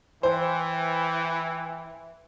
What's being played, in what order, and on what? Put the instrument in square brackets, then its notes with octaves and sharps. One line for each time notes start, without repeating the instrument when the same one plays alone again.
[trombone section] E3 [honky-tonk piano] C5 [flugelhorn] G5